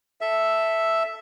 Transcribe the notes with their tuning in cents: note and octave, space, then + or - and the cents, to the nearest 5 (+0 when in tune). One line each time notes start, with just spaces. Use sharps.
A4 +0 E5 +0